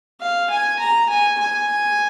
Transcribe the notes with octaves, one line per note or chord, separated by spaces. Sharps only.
F5
G#5
A#5
G#5
G#5